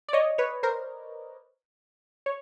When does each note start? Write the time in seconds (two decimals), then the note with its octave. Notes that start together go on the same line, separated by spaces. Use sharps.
0.09 D5
0.13 C#5 D#5
0.38 B4 C#5
0.63 A#4 C5
2.26 C#5